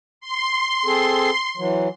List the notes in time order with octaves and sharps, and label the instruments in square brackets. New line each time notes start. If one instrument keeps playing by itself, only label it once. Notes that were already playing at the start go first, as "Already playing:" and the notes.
[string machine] C6
[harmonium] C4 G#4 A4
E3 F#3